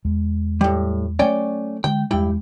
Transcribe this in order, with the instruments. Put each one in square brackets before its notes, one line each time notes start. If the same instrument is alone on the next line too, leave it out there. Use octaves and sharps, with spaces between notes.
[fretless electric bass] E2 G#3
[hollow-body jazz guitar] A2 G3
[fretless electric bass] F#3 A3 [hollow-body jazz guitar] C#4 D5 G5
[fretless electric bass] D3 G#3 [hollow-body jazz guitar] G5
[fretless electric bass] E2 G#3 [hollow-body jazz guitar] G2 E4 G5